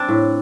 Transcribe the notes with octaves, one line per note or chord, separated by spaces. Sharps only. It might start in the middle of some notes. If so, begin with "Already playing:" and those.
Already playing: C4 D4
A2